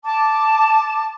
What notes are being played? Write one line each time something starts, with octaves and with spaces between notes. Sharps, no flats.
A5 D6